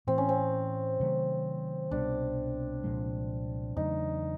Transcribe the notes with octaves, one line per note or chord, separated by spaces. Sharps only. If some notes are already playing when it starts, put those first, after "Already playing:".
A2 E3 A3 C4
C#4
C4
C3 D#3 F#3 A3
C2 B2 G3 D4
C2 A#2 F3 G#3
E2 C#3 F#3 A3 D#4